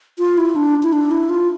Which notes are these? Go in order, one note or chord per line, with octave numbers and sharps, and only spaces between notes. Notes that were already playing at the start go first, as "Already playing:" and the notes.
F4
E4
D4
E4
D4
E4
F4